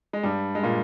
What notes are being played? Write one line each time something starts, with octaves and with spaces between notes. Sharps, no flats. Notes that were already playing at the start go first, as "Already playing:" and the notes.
G#3
G2 G3
G#3
A#2 A#3